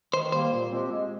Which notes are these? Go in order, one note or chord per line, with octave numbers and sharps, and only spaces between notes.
D#3 C5
G3 A#3 C5
A#2
F3 G#3 C4 G4
G#3